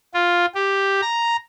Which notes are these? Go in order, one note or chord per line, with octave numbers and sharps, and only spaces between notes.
F4
G4
A#5